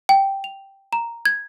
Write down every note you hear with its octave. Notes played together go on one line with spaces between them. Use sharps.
G5
F7
A#5
G#6